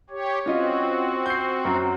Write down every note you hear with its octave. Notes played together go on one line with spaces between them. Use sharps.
G4 C#5
C4 C#4 F4 F#4 D#5
G6 C7
F#2 F#3